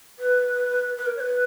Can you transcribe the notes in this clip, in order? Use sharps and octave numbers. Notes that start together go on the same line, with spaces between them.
B4
B4
A#4
C#5
B4